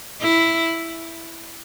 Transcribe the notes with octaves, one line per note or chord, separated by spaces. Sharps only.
E4